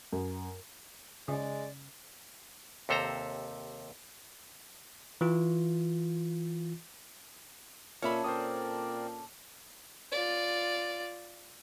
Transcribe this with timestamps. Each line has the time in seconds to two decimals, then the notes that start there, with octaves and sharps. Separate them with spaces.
0.13 F#2
1.28 C#3 G#3 D5
2.89 D#2 C3 A4 C5 A#5
5.21 E3 F4
8.02 A#2 C#4 D4 A4 C#5 E5 B5
8.24 A#2 C4 A#4 C5 D5 D#6
10.12 F4 D5